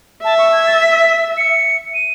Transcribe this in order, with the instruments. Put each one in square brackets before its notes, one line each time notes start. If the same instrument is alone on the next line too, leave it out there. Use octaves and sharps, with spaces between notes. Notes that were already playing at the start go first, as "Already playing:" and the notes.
[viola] E5 [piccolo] A5
[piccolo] C#6
G#6
A6
B6
C#7
D#7